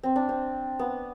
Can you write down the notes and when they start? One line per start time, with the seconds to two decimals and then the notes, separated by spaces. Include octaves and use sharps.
0.03 C4
0.16 D4
0.29 C4
0.79 B3